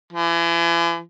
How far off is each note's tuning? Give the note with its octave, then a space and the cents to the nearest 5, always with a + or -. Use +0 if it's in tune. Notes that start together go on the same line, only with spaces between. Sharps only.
E3 +40